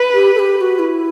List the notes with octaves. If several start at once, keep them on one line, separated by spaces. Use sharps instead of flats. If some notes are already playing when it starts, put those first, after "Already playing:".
Already playing: B4
G4
A4
G4
G4
F#4
E4